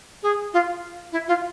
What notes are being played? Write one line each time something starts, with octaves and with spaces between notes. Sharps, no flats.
G#4
F4
E4
F4